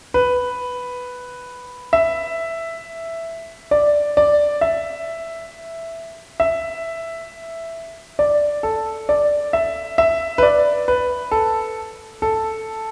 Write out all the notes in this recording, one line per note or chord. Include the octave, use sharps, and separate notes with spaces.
B4
E5
D5
D5
E5
E5
D5
A4
D5
E5
E5
B4
D5
B4
A4
A4